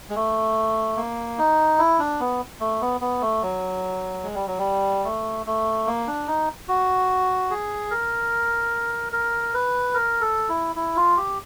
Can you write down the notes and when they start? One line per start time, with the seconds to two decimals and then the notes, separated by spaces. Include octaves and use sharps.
0.10 G#3
0.16 A3
0.97 A#3
1.38 D#4
1.79 E4
1.99 D4
2.20 B3
2.60 A3
2.81 B3
3.01 B3
3.21 A3
3.42 F#3
4.24 G#3
4.35 G3
4.47 F#3
4.59 G3
5.05 A3
5.46 A3
5.87 A#3
6.07 D4
6.27 D#4
6.68 F#4
7.50 G#4
7.91 A#4
9.13 A#4
9.54 B4
9.94 A#4
10.21 A4
10.49 E4
10.76 E4
10.97 F4
11.17 G4